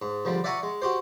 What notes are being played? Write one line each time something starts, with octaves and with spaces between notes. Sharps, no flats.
G#2
C#2 D3 F3 G3
D5 E5 F#5 G#5 A#5 C#6
G#3
F#4 G4 C5